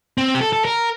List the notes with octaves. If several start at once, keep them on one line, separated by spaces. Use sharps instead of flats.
C4
G4
A4
A4
A#4